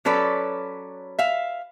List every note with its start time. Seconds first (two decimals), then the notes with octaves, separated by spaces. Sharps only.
0.05 F#3 C#4 A4 B4 D5
1.18 E5 F5